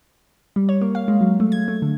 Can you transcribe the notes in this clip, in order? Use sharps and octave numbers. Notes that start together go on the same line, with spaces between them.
G3
C#5
A#3
F5
G#3
F#3
A3
G#6
A3
D3